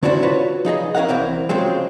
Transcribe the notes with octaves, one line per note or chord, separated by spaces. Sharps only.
D3 C#4 D4 E4 F#4 C5
F4 F#4 B4 C#5
F3 D#4 G#4 D#5
C#4 E4 A#4 F5 F#5
C2 E3 C4 A#4
C#3 F3 F#3 G#3 C4